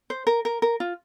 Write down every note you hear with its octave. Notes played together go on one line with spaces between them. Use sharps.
C5
A#4
A#4
A#4
F4